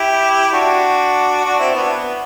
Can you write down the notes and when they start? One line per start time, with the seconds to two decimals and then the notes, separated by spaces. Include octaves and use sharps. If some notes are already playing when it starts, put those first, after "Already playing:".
Already playing: E4 G4
0.52 D4 F#4
1.45 D4 F#4
1.59 C4 E4
1.74 B3 D4
1.90 B3